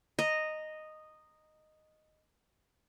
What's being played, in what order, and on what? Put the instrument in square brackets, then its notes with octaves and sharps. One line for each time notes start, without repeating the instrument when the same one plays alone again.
[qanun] D#5 A#5